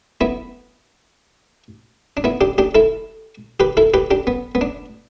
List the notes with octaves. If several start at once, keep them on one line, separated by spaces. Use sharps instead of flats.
B3 E4
D4
B3 E4
D4 G4
D4 G4
E4 A4
G4 B4
E4 A4
G4 B4
D4 G4
B3
B3
D4